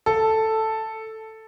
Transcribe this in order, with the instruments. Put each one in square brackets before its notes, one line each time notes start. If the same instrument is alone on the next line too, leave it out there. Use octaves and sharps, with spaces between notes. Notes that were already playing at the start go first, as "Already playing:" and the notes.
[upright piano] A4